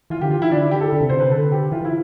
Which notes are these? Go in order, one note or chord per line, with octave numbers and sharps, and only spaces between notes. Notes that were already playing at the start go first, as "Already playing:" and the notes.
E3 F4
D3 G4
E3 F4
E4
D3 D4
E4
G4
A4
D3
C3
D3 C5
C3 B4
D3 A4
G4
E3 F4
E4